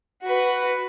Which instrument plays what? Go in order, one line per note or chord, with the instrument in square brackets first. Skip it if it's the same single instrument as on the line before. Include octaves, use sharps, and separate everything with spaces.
[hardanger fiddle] F#4 B4